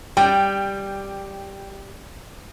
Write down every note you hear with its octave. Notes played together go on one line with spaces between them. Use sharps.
G3 G5